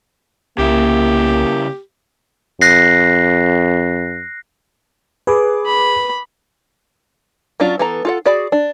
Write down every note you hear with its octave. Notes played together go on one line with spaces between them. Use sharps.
C2 C#3 A#3 E4 G4
F2 F#6 A#6 C7
G#4 B4 D6
B5
F#3 C#4 D4 F4
E3 B3 A4 A#5
F4 A4 F#5
F#4 G#4 D5 B5
D4